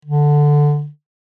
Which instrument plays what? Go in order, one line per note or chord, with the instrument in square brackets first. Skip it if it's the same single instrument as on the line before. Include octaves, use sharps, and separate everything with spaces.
[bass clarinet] D3